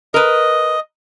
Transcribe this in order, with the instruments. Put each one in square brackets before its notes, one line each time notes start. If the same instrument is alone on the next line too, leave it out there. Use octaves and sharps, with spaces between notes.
[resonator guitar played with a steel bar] A#4 B4 [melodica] D#5